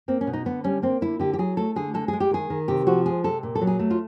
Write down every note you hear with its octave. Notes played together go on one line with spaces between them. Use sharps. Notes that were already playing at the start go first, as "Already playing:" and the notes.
A#3 C4
C#4
B2
D#4
D3 B3
G3 C#4
A#3 C4
D3 E4
D3 G4
G4
F#3 G#4
A3 A4
D3 G#4
G#3 A4
G#4
G#3
G4
D#3 G#4
D#3
C3 G4
F3 F#4
G#3 G#4
C3 A4
A#2
A4
F#3
G#4
A3
F4